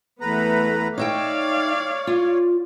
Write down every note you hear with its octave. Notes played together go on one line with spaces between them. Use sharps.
E2 A3 B3 B4 A#5
D#4 C#5 D5 E5 F5 G5
F4